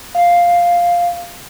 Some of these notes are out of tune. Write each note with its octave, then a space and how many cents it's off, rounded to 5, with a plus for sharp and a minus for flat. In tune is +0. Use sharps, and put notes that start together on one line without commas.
F5 +0